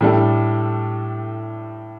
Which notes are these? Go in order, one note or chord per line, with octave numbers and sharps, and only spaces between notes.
A2 G3 D4 A4